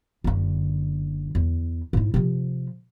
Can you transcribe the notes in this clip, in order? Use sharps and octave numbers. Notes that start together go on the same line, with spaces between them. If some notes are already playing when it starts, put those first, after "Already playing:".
F#1 D3
E2
G#2 E4
C3 F3